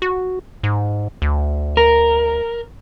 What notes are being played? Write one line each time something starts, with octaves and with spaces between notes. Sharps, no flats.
F#4
G#2
D2
A#4